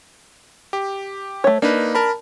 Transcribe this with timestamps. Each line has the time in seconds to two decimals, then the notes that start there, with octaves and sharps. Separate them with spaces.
0.73 G4
1.44 A3 C#5
1.62 A#3 D4 D#4 B4
1.95 A#4 A5 B5